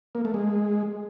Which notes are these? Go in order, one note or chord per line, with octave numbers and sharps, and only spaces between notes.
A#3
A3
G#3